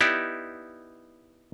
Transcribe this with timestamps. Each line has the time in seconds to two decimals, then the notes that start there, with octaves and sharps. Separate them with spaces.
0.01 B3 D#4 E4 G4 D5